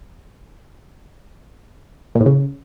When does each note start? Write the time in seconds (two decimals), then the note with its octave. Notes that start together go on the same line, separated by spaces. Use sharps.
2.15 A#2
2.21 A2
2.26 C#3